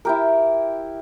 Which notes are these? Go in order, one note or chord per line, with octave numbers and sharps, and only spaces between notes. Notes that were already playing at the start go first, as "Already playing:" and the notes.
E4 G4 A#4